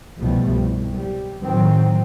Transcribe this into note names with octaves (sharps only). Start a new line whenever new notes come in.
C2 G2 B2 F3 G3 A3
C2
G3
A2 D#3 F#3 C4